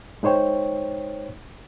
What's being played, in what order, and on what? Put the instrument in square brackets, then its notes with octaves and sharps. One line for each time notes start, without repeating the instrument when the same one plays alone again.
[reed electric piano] G#3 D#4 C5 C#5 G5